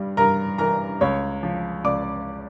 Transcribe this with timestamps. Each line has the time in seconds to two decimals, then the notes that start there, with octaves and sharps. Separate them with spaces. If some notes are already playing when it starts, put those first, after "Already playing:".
Already playing: G2 G3
0.17 G2 A#4 A#5
0.58 E3 A#4 A#5
1.01 C#2 C#5 C#6
1.43 F3
1.84 C#2 D5 D6